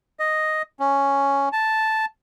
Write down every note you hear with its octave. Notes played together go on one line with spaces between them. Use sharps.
D#5
C#4
A5